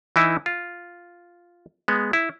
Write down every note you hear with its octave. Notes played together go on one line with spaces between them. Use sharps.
E3 D#4 E4
F4
G#3 B3
E4